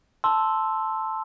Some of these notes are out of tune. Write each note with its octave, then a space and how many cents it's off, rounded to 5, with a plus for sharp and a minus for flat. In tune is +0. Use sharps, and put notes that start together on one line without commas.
A5 +0 C6 +0 E6 +0